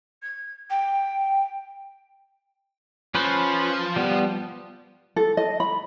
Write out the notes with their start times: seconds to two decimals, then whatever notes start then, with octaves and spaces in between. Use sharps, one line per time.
0.22 G#6
0.70 G5
3.15 F3 C#4 B4 C5
3.96 G3 B3
5.16 A4
5.37 D#5
5.60 B5